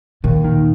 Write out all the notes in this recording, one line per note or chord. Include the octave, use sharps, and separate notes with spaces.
D#2 A#2
D#3